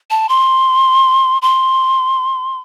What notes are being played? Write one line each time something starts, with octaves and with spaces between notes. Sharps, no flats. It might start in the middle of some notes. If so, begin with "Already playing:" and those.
A5
C6
C6